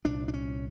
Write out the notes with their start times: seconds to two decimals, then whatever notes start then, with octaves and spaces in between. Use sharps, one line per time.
0.05 C2 A#2 D4
0.28 D4
0.34 C#4